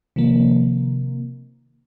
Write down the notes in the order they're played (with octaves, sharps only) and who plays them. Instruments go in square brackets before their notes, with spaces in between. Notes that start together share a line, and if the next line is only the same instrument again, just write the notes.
[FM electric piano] C3 D#3 F3 A#3